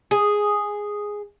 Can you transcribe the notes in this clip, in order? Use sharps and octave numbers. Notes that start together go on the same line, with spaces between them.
G#4